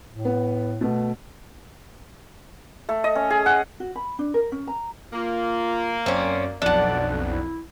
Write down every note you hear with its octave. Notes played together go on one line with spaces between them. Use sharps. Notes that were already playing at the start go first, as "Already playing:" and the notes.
A2
B3
B2 A3 B3
A3
D#5
C#4
G#4
F#5
F#4
B5
D4
A#4
C#4
A#5
A#3 F4
F#2 C4 C#4 D5
B1 F2 D4 D5 F#5
E4